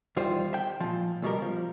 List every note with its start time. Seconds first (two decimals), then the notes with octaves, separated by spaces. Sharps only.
0.16 E2 D#3 G3 F4 C5
0.53 E5 G5
0.80 A#2 F3
1.22 C#2 B2 G3 A#4
1.42 F3